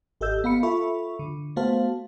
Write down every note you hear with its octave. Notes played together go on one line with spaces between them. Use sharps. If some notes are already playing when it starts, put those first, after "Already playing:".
G#1 G4 A4 D#5 E6 G6
B3 F5 B5 C#7
F4 A4 E5 B5 C#6
D3
A3 B3 F#4 C5 F5 A5